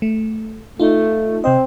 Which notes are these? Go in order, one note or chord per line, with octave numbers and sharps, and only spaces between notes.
A3
A3 D#4 F4
C3 C4 D#5